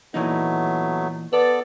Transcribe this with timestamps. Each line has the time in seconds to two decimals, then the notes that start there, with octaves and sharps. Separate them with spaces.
0.14 A#2 E3 F#3 A3 B3 D#4
1.33 B3 A4 B4 D5